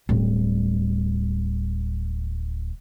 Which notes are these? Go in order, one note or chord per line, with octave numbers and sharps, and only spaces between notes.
D1 G3